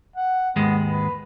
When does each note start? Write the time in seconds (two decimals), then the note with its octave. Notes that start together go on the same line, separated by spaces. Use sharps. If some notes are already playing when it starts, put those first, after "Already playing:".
0.16 F#5
0.56 D#2 G#2 G#3 B3
0.90 B4